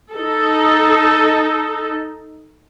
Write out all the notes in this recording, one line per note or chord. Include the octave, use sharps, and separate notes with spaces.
D#4 A4